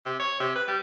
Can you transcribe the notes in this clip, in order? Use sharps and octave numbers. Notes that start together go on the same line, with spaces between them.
C3
C#5
C3
B4
G3